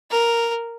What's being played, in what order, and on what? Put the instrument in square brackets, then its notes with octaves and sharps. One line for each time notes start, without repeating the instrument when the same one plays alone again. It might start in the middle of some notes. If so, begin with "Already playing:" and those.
[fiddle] A#4